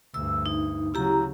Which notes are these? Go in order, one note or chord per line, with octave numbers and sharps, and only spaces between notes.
D2 G2 E6
D#4
C#3 F#3 E4 G4 A#5